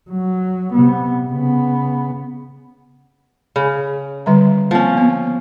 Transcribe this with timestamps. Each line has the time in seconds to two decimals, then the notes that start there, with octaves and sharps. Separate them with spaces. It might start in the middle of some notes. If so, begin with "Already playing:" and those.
0.10 F#3
0.73 C3 B3
1.29 C#3 B3
3.56 C#3 B5
4.26 D3 G3 A#5
4.71 F3 A#3 C4 C#4
4.97 B3